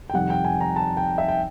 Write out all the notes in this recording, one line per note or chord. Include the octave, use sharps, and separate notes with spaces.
G5
F2 C3 D#3 G3 F#5
G5
G#5
A#5
A5
G5
E5
G5